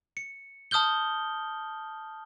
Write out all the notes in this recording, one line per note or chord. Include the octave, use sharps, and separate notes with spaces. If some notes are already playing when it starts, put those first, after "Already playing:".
C#7
A5 D#6 F6 G6 G7